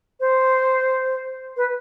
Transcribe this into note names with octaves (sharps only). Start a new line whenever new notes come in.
C5
B4